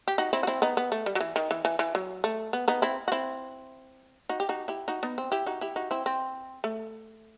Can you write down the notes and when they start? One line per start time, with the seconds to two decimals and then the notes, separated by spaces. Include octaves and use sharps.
0.08 G4
0.18 D#4 F#4
0.33 C4 E4
0.43 F#4
0.47 C4 E4
0.62 B3 D#4
0.77 B3
0.92 A3
1.06 G3
1.15 F#3
1.20 E3
1.36 D#3
1.51 E3
1.65 E3
1.79 E3
1.95 F#3
2.24 A3
2.53 B3
2.68 B3 D#4
2.82 C4 E4
3.08 F#4
3.12 C4 E4
4.29 D#4 F#4
4.40 G4
4.49 D#4 F#4
4.68 E4 G4
4.88 D#4 F#4
5.03 B3 D#4
5.18 C4
5.32 E4 G4
5.46 D#4 F#4
5.61 E4 G4
5.76 D#4 F#4
5.91 C4 E4
6.06 C4
6.64 A3